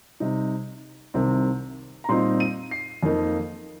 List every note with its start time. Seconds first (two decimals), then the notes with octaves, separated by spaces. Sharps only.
0.20 C3 G3 D#4
1.14 C2 C3 D#3 C4
2.04 A#5
2.09 A#2 G3 C4 D#4 C6
2.40 D#7
2.71 C7
3.03 F2 F3 A#3 D#4